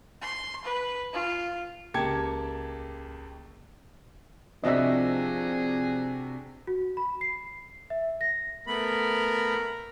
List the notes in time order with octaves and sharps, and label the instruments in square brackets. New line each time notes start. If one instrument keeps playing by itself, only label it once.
[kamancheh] C6
B4
F4
[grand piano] C#2 A#3 G4 A5 G#6 C#7
[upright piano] C3 D4 F#4 [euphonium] F3 [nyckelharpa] G#4 [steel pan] D#5 E5
[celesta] F#4
B5
C7
E5
A#6
[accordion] A3 B3 B5 [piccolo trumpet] A#4